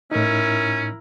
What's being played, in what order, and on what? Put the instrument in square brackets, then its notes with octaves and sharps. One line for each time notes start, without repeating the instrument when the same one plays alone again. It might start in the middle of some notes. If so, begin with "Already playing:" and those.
[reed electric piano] A2 D#4 [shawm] C#4 [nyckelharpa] E4 A#4